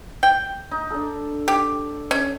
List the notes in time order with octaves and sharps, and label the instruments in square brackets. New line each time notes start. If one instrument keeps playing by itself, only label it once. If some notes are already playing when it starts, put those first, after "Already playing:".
[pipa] G5
[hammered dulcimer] D#4
D4 A4
[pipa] G4
C#4